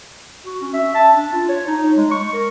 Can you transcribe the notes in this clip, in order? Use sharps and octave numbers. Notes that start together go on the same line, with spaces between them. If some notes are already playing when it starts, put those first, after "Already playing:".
F#4
C#4
E5
A5
D4
F4
C#5
D#4
G#3
C#6
A#4